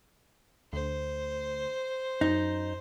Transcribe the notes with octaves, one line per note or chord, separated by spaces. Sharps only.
D2 C5
F#2 D#4